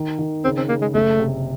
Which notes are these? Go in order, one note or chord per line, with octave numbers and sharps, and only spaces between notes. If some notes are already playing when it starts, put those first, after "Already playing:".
Already playing: D#3
D#3
C#3 C4
C4
C#3 A#3
G#3
F#1 A3
C3